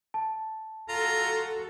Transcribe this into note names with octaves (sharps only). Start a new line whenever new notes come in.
A5
F4 F#4 A4 A#5